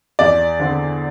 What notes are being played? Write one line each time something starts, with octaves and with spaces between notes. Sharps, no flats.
E2 D5
D3 C4